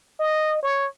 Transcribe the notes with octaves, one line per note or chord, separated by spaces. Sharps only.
D#5
C#5